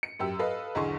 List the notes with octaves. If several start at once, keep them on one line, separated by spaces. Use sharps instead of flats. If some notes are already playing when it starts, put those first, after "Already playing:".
C#7
F#2 G4 E6
A4 B4 D#5 F5
B1 E2 D3 G#4 C6 C#6